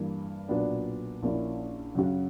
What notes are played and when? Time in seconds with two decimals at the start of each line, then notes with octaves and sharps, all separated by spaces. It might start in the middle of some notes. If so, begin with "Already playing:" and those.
Already playing: G2 E3 A#3
0.49 B1 A#2 F#3 B3 D4
1.23 A#1 A#2 A#3 C#4 E4
1.95 F#2 C#3 F#3 C#4 F#4